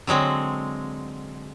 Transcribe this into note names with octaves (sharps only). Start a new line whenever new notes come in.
D3 F#3 G#3 C4